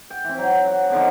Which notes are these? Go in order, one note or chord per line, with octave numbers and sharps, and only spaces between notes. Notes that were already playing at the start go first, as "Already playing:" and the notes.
G5
E3 C4
F#3
F#5
B2 D3 D#3 F3